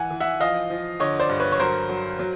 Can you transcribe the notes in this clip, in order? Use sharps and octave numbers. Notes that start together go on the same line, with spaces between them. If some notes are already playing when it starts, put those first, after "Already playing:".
Already playing: E3 F#5 G#5
E3
E5 F#5
F3 D#5 F5
F3
D3 C#5 D#5
C5 D5
G2
B4 C#5
C#5
F#3 A#4 C5
F#3
F#3